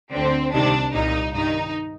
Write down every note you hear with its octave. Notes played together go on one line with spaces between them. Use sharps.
D2 D3 C4
C2 C3 D#3 D4
C2 A#2 D#4
G2 D#3 D#4